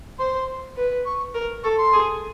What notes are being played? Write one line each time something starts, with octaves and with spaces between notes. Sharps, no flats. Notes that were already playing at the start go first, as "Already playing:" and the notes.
C5 C6
B4
C#6
A#4
A4 C#6
C6
G#4